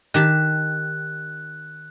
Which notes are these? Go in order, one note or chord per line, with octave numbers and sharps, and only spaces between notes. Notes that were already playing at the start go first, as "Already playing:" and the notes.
D#3 G4 A5 F#6